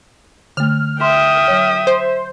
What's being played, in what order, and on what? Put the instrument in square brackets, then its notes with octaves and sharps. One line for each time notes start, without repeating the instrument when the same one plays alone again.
[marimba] D3 A3 [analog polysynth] F6
[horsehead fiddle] E5 [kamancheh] G5 D#6 [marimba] C6
[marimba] F#3 C#5
[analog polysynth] C5